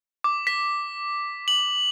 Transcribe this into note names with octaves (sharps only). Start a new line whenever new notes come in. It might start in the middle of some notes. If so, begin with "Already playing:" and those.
D6
B6
F#7